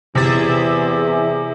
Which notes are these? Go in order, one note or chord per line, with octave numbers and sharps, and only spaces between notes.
E2 C3 G#4 E5 A6